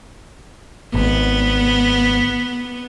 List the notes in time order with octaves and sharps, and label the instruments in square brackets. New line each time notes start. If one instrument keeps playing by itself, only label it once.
[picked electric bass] G#1 [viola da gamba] B3